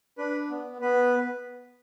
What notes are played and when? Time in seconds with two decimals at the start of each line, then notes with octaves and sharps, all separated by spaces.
0.18 D4 B4
0.50 B3
0.81 B3 B4